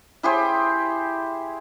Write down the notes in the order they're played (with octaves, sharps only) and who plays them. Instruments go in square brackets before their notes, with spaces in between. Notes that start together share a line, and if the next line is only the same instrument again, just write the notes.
[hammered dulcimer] E4 G4 G#4 C5